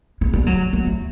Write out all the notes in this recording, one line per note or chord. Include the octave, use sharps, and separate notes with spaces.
G#3
G3
F#3
A3
A3